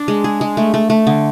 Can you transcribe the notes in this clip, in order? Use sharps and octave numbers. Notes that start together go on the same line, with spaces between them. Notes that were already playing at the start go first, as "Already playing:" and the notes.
Already playing: D4
G#3
G#4
G#3
A3
A3
A3
D3